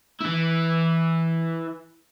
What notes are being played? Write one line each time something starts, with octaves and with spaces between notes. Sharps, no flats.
E3 E4